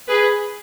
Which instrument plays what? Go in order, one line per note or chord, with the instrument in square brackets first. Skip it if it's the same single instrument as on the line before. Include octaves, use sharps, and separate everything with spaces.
[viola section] G#4 B4